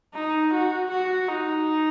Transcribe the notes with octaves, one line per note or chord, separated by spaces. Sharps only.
D#4
F#4
F#4
D#4